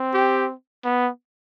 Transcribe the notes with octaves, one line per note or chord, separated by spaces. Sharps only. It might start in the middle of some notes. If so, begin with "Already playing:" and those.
Already playing: C4
G4
B3